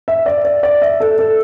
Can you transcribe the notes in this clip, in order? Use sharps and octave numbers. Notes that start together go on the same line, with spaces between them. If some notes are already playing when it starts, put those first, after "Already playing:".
E5
D5
D5
D5
E5
A4
A4